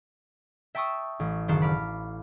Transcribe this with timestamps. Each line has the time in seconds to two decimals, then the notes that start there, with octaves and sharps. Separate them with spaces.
0.75 E5 G5 A5 C#6 D#6 E6
1.20 A1
1.48 F#1 D#3 F#4 C5 F5 A5
1.62 B5 D6 F6